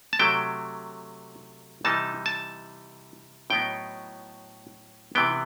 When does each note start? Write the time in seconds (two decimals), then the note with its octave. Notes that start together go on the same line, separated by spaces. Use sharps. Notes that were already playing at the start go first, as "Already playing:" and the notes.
0.13 A5
0.19 C3 F#3 A3 G5
1.85 C3 E3 G3 D#4 A5
2.26 A5
3.50 A2 F#3 B3 D#4 G5
5.15 C3 E3 B3 G5